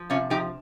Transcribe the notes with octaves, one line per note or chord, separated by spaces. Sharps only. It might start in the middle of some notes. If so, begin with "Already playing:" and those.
Already playing: F3
C3 C#4 F4
F3 D#4 G4